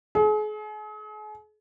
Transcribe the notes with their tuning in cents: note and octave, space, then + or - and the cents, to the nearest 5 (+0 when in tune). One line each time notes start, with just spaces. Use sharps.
G#4 +40